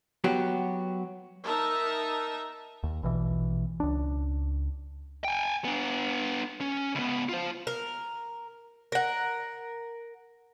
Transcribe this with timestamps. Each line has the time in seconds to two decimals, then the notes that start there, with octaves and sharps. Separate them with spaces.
0.24 F#3 B3 F#4 G4
1.45 D#4 A#4 E5 A5 A#5
2.83 D#2
3.03 A#1 B2 E3
3.80 C#2 D4
5.24 G5 G#5
5.65 B3 D4
6.61 C#4
6.95 C#2 B3
7.29 F4 C5
7.67 A#4
8.92 A#4 F#5